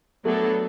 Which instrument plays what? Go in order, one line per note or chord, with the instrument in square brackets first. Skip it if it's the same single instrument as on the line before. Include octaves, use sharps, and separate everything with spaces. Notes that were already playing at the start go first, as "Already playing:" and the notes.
[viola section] F#3 B3 D4 A4 [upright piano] A3